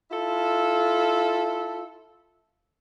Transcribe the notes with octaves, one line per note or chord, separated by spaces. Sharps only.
E4 F4 A4